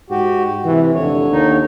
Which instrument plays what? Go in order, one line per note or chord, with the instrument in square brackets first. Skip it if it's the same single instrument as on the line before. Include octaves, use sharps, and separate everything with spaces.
[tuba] G#2 [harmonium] F#4 G4
[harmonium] C3 [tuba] E3
[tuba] F1 [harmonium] D3 C#5
[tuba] D#2 [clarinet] D#4